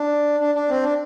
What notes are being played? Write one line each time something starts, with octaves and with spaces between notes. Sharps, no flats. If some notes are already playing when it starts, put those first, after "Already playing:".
Already playing: D4
D4
D4
C4
D4